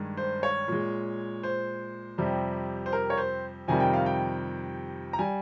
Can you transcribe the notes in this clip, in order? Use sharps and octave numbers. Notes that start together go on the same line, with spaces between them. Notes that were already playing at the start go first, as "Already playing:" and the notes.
Already playing: G2 D#3 G#3
C5
C#5
A#2 G#3
C5
F2 C3 G3
C5
A#4
C#5
C5
F2 C3 D#3 G3 G#5
G5
F5
G5
A#5
G3 G#5